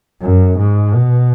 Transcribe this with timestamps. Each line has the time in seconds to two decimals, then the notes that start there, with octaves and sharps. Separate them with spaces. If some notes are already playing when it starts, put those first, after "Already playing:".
0.21 F#2
0.58 G#2
0.94 B2